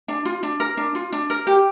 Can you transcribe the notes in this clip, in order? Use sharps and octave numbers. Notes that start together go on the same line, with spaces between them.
D4
F4
D4
A#4
D4
F4
D4
A#4
G4